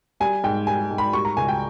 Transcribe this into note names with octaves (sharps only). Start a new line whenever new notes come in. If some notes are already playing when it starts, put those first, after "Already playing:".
G3 G#5
G#2 G5
G3 G#5
G#2
B5
G3 C#6
A#5
C#2 G#5
G5